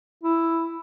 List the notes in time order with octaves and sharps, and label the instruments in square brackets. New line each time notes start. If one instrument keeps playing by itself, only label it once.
[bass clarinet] E4